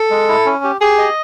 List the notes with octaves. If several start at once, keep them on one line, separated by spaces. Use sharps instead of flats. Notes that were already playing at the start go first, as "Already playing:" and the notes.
Already playing: A4
G#3
E4
C#4
G4
G4 G#4
D#5